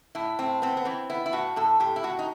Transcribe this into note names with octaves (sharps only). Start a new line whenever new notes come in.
A2 E4
A2 C4
B3 C4
B3
E3 C4
B3 E4
E4
A2 F#4
A2 A4
A2 G4
E4
A2 F#4
D#4